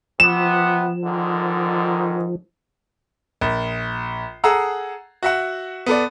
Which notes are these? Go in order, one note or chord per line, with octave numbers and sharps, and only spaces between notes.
C3 F3 B3 E7
G#2 D3 D#3
A#1
G#4 A4 F#5 A#5 E6
F#4 E5 F#5
B3 A4 D5